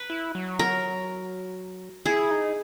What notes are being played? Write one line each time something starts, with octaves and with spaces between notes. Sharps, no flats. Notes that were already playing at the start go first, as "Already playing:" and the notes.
Already playing: B4
E4
F#3
A#4
E4 G#4
D#4